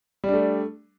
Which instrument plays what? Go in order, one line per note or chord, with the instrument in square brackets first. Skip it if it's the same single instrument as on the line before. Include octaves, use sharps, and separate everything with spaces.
[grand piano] G3
D4
A3